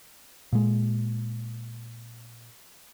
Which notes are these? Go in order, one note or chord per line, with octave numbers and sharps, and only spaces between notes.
A#2 G#3